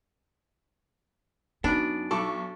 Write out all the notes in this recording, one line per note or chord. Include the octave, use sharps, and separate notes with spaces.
F#2 B3 D4 D#4
B1 A4 D5 C#6